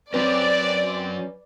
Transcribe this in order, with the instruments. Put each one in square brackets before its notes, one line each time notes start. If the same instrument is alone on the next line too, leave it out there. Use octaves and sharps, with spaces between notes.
[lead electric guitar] F#3 C#4 [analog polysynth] C4 [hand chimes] B4 [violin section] D5